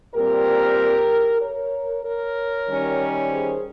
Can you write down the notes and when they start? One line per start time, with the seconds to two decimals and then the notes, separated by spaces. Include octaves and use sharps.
0.15 A#2 G3 C4 G4 A#4
1.42 A#4 C#5
2.04 A#4 C#5
2.68 D#3 G3 C#4
3.31 G#4 C5